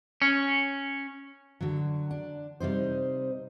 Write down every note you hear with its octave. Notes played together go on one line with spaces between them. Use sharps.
C#4
D3 F#3
D4
C3 G3 D#4 C5